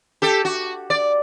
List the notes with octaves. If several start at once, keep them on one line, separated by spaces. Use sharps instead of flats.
G4 A4
F#4
D5